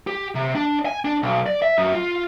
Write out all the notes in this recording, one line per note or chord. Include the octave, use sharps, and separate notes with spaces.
G4
C3
D4
G#5
D4
B1
D5
E5
F#2
F4